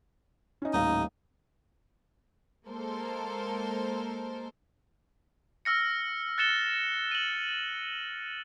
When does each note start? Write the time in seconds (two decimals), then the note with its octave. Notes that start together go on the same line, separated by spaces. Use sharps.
0.62 C#4 D#4
0.74 D#1 A1 D#4 F5
2.67 G#3 A#3 A4 A#4 C5
5.65 E6 F6 A#6 C#7
6.38 F#6 A6 C#7 E7 G7
7.11 D#7 F#7